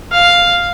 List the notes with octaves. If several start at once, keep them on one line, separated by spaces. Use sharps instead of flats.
F5